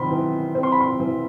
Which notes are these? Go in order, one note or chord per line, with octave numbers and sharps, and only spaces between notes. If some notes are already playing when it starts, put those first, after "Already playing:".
Already playing: D#3 C4 B5 C6
E3
C4
C6
B5
C6
E3